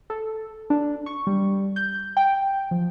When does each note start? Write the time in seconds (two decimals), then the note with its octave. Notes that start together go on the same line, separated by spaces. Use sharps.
0.10 A4
0.70 D4
1.06 C#6
1.27 G3
1.76 G6
2.17 G5
2.71 F3